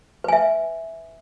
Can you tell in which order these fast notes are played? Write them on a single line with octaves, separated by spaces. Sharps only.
B4 G#5 E5